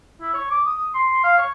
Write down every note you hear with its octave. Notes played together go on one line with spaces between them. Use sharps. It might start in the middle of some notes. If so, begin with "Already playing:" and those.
E4
C#5
D6
D#6
C6
F5
C#5